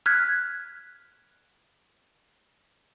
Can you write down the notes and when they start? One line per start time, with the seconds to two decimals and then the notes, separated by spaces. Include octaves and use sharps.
0.06 F6 F#6 G#6 B6